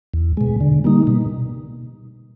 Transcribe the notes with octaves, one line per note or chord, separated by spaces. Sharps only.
E2
B2 G#3
D3
G3 A#3 D#4
B2